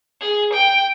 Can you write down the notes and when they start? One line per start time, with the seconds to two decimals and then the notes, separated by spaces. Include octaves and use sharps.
0.21 G#4
0.53 G5